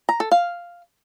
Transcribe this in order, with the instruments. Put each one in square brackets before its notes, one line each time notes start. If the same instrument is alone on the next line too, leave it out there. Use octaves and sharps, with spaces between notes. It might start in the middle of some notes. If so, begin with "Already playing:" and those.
[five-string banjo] A#5
A4
F5